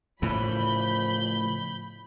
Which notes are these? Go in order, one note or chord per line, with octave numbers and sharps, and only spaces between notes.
A2 C#3 E3 F3 B5 G6